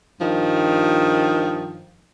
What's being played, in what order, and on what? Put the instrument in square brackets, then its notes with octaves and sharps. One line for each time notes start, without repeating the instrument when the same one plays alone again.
[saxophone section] G2 D#3 F3